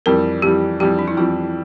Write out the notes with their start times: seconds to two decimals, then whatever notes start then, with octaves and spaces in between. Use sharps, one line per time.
0.06 F2 E3 G3 A#4
0.42 F2 E3 G3 G4
0.80 F2 E3 G3 G4
0.99 D4
1.08 E4
1.17 F2 E3 G3 F4